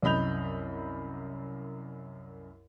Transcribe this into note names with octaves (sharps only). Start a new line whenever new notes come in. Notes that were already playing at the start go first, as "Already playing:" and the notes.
C2 F#2 D#5 B5 G6 F7